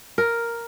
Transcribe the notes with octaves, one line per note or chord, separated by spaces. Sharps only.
A#4